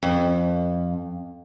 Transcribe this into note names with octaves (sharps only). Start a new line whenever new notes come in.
F2